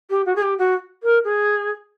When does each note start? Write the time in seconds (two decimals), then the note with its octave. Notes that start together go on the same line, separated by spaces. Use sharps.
0.10 G4
0.26 F#4
0.36 G#4
0.43 G4
0.58 F#4
1.03 A#4
1.24 G#4